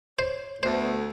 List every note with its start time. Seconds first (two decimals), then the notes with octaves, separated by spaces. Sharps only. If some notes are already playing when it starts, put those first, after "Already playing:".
0.19 C5 C#5
0.63 D2 A3 B3 C5